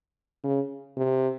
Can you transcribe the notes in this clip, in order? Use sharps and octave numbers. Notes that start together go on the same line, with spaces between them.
C#3
C3